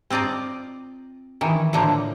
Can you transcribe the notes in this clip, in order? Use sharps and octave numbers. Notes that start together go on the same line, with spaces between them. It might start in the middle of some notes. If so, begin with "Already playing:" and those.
C4 F4 D5 D#5 A#5
D#3 E3
A2 D3 F3 A#3 A#5